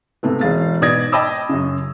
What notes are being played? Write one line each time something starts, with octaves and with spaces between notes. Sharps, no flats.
G#2 C3 A3 B3
E1 G#4 F5 A6
G#2 B2 D5 D#6 G#6 A#6
D#5 G5 A5 B5 D6 E6
F#2 C#3